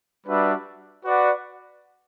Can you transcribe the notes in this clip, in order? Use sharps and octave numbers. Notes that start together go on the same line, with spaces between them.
G3 D4 F#4 B4 E5
F#4 B4 D5 F#5